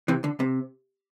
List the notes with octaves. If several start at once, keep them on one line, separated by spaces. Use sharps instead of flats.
C3 E3
D3
C3